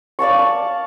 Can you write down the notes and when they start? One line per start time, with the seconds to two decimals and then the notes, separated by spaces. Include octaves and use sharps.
0.19 D5 F5 A5 C#6
0.39 A5